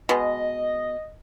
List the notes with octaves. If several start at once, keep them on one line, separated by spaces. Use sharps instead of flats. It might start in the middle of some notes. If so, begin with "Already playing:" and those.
B2 G#3 D#5